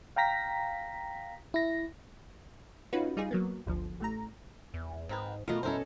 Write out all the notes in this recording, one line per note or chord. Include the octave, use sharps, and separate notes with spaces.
F5 G5 A#5 A#6 B6
E4 A#6
C#4 D#4 F4 F#4 B4
G3 D#4 F4 G#4
F#3 A#3 B3
G1 D2 F3
A1 A3 A#5
E2
G#2 C4 A#4 B4
B2 A3 B3 F4 A#4 D#5
C#4 E4 A4 A#4 C5 D#5